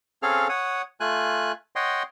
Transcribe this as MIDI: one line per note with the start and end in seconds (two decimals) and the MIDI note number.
0.23 0.48 60
0.23 0.48 61
0.23 0.48 68
0.23 0.48 69
0.23 0.48 77
0.23 0.48 89
0.49 0.82 73
0.49 0.82 78
0.49 0.82 87
1.00 1.52 57
1.00 1.52 65
1.00 1.52 80
1.00 1.52 90
1.76 2.03 73
1.76 2.03 75
1.76 2.03 78
1.76 2.03 79
1.76 2.03 84